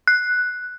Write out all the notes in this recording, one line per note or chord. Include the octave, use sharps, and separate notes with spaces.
F#6